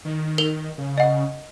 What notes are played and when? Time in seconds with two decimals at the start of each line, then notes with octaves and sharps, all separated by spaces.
0.05 D#3
0.38 A#4 F7 G7
0.78 C#3
0.98 D#5 F#5